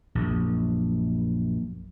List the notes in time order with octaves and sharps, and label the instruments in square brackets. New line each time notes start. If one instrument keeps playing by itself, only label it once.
[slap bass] A#1 F#2